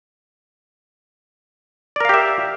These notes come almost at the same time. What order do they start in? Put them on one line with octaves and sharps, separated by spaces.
D5 A#4 F5 G4 E5